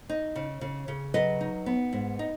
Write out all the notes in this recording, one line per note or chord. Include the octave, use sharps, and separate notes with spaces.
D#4
C#3
C#3
C#3
F#3 B4 D#5
D#4
B3
G#2
D#4